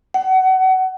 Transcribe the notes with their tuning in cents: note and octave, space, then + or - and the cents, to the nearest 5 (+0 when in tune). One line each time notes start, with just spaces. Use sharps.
F#5 +25